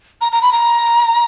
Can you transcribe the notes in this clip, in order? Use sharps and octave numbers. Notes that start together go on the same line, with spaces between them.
A#5
A#5
B5
A#5